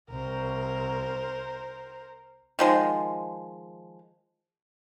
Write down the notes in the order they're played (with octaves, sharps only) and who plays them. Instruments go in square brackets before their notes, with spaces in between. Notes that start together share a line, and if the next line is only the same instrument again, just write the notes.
[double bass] C2 [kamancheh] A#4 C5
[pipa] D#3 F3 G#3